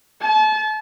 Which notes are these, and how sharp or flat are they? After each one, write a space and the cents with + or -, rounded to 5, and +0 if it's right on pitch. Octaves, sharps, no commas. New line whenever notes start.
A5 -35